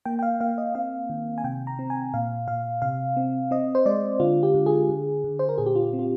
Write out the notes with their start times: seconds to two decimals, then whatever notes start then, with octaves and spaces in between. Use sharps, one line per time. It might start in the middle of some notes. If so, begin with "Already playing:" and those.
0.05 A#3 G5
0.19 G5
0.23 F5
0.40 A#3 F5
0.58 D#5
0.75 C4 F5
1.10 D#3
1.38 G#5
1.44 C3 G5
1.67 A#5
1.79 C4
1.90 G#5
2.14 A#2 F5
2.48 A#2 F5
2.82 C3 F5
3.17 C4
3.51 C4 D#5
3.75 C5
3.86 G#3 D5
4.20 D3 F4
4.43 G4
4.54 D3
4.66 G#4
4.89 D3
5.24 D3
5.39 C5
5.49 A#4
5.58 A#2 G#4
5.66 G4
5.75 F4
5.93 C4
5.99 F4